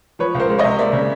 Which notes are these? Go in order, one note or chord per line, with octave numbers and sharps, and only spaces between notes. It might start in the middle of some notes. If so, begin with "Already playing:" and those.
F3 B4 C#5
C#2
A#4 C5
G#3
C#5 D#5
C3
A#3 D5 E5
C#3